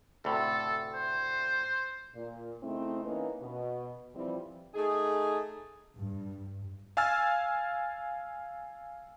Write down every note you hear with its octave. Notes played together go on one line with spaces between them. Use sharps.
D2 A2 C3 A4
C5
A#2
C#3 A3 C4 D#4 E4
E3 A#3 C#4 D#4 B4
B2
E3 F3 G3 C4 E4
A3 D#4 G#4
G2
F5 G#5 E6 F6 A6